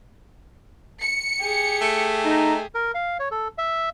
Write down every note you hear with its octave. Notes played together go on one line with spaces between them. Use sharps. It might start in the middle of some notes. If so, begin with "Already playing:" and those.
C#7
G4 G#4
A3
D#4
A#4
F5
C#5
A4
E5